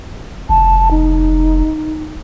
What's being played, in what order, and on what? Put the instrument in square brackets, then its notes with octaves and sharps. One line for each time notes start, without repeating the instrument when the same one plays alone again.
[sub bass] F1 [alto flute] A5
[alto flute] D#4